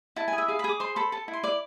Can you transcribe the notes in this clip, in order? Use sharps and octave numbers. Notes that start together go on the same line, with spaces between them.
E4 A5
G#5
G#4
E5
G#4 F5
B5
G#4
D6
C5 C6
A4 B5
A4 A5
E4
C6
D5 D6